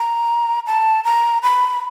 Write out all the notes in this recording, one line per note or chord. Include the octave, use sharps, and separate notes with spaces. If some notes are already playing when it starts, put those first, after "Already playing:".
Already playing: A#5
A5
A#5
B5